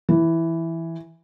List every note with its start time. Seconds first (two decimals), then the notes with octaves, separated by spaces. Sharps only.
0.09 E3